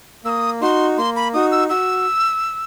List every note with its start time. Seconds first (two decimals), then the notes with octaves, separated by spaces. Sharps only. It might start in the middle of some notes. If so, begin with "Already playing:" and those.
0.25 A#3 E6
0.29 D#6
0.61 D#4 F#4 C6
0.98 A#3 C6
1.16 B5
1.34 D#4 F#4 D#6
1.51 E6
1.69 F#4 E6